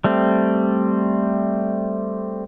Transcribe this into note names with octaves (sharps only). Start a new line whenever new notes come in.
G3 A3 C4